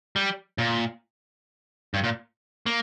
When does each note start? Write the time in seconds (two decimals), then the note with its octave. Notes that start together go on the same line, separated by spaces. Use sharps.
0.16 G3
0.58 A#2
1.94 G2
2.04 A#2
2.66 A#3